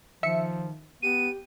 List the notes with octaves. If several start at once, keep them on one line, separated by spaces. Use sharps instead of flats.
D#3 F3 E5 C#7
B3 G4 D#7